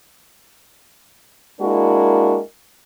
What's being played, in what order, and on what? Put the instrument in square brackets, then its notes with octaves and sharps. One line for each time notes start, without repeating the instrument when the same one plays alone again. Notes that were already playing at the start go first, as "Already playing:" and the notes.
[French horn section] G#3 A#3 D4 E4 F#4 A#4